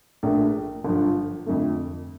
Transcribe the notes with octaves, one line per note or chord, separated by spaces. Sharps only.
A#1 A#2 A3 D4
G1 G2 F3
F2 D3 A3